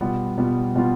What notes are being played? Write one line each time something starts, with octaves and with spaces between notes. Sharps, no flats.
B2 G3 B3 F4
B2 G3 B3 F4
B2 G3 B3 F4